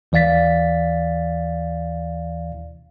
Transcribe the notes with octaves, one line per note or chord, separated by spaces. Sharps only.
D#2 E3 D5 F5 A6 B6